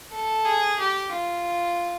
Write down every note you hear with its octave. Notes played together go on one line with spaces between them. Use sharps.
A4
G#4
G4
F4